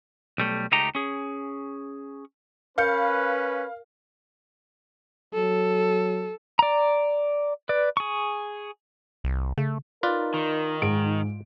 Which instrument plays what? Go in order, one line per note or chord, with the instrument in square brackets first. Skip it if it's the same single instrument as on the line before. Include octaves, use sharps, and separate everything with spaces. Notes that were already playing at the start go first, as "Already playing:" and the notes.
[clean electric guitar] B1 G3 A3
C#2 A3 D#4 G4 A#5
C#4 G#4
[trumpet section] C#4 B4 [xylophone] A#4 G6 C#7 [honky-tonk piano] F5
[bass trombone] F#3 [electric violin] A4
[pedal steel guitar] D5 A#5
B4 D5
G#4 C#6
[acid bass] C2
[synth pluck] C#3 [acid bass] A3
[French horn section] D#4 A#4 [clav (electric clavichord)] F4 B4 D5
[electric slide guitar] D#3
[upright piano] G#2 D7